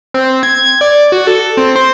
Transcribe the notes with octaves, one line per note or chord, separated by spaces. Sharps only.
C4
G#6
D5
F#4
A4
C4
C5